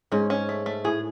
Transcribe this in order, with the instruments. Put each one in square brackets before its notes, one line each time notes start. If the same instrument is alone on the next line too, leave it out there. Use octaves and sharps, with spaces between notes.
[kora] G#2 [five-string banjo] C#4
[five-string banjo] C#4
A3
A3
[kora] A2 [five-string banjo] G#4